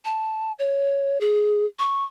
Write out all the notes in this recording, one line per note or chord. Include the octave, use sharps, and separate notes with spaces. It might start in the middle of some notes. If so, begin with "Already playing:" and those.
A5
C#5
G#4
C#6